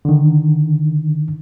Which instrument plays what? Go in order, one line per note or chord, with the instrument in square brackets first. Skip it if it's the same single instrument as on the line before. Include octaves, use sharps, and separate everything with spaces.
[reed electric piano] D3 D#3